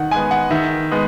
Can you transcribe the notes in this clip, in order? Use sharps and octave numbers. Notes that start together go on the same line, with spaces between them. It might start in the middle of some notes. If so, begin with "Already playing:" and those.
Already playing: D#3 F#5
G#3 B3 G#5
F#5
D#3 E5
G#3 B3